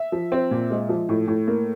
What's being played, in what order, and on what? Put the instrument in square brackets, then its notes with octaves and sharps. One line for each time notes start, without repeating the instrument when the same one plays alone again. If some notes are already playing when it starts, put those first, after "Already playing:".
Already playing: [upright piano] E5
F3
C4
A#2
G#3
F3
A2
A2
A#3